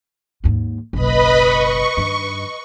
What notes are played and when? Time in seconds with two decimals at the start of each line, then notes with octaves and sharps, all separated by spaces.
0.44 D#2 G#2
0.93 F#1 B1 B4 D#5 B5
1.38 C#6
1.97 G2 D#3